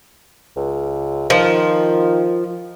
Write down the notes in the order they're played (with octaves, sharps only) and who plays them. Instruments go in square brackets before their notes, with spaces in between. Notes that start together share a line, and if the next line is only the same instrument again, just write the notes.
[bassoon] C#2
[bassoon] D#3 [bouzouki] F3